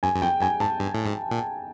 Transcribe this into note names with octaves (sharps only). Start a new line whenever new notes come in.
F#2 G#5
F#2
F2 G5
F#2 G#5
G#2 A5
G2
A2
G#2
A#2